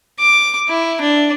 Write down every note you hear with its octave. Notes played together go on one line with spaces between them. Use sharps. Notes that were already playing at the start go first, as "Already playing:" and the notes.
D6
E4
D4